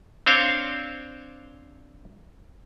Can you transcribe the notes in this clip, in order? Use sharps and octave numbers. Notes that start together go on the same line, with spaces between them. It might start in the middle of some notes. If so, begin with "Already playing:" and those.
C4 D4 C5 C#5 F5